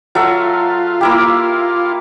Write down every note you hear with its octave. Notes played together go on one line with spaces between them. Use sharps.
F#3 F4 A4 E5
A#3 E4 G4